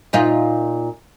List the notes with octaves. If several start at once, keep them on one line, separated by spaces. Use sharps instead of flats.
A#2 D#4 F4